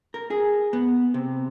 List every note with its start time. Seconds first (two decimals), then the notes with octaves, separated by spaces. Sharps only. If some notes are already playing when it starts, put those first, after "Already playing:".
0.14 A#4
0.30 G#4
0.73 B3
1.14 C3